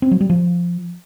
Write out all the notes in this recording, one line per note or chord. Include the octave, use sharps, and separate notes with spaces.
C4
F#3
G3
F3